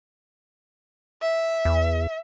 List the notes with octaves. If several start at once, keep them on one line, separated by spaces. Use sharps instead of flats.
E5
E2